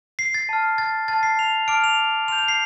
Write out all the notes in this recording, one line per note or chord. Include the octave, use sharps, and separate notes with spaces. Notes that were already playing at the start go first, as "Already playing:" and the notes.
C7
A6
A5 F6
A6
A5 F6 A6
C7
F7
A5 D6 F6 D7
F7
C6 G6 F7
F7
C7